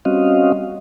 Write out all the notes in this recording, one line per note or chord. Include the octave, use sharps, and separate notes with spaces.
G3 C4 C#4 F#4 D#5 F5